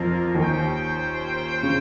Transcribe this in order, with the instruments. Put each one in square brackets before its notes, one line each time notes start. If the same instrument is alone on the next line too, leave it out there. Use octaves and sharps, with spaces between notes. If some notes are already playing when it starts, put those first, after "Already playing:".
Already playing: [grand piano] F2 F3 [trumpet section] A#3 F4 A#4
[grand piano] D#2 D#3 [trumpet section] C#4 F4 C5 G5
[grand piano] C#3